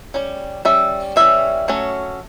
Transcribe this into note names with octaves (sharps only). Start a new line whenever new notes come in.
G3 C#4
G3 C#4 E5
E3 G3 C#4 E5
F#3 A3 C#4